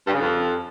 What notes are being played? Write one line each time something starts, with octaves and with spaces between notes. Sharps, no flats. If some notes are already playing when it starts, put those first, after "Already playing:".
G2
C#3
F2